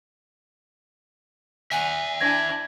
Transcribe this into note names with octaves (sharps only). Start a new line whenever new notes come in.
E5 F#5 G#5
D4 E4 G#6 A#6